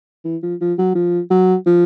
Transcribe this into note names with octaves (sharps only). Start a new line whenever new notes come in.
E3
F3
F3
F#3
F3
F#3
F3